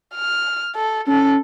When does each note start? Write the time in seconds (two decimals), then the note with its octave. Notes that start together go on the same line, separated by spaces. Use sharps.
0.15 F6
0.76 A4
1.08 C#4 A4